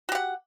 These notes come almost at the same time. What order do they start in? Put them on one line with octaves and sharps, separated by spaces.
F#4 G4 F#5